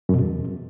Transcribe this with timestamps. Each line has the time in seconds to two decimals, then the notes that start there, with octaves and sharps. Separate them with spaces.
0.09 F#2
0.14 B2
0.19 E2